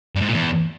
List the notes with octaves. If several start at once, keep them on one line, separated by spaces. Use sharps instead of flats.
G2
G#2
A#2
E2